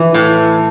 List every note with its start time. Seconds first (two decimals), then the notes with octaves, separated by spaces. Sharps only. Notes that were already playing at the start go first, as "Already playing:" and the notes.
Already playing: E3
0.14 A2